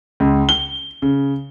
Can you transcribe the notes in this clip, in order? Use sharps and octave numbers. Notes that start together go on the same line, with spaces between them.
C#2
G7
C#3